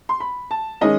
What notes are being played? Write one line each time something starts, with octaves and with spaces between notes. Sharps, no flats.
C6
B5
A5
D#3 G#3 C#4 D#5